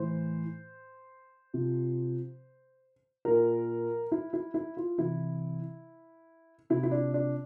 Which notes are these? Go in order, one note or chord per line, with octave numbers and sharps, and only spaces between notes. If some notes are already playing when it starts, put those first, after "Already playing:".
Already playing: A2 E3 C5
C3 F3
A#2 F3 A#4
E4
E4
E4
F4
C3 E3 E4
C3 F3 E4
E4
D4
D4